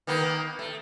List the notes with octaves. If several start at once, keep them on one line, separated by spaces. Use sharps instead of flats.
D#3 A#3 B3
A3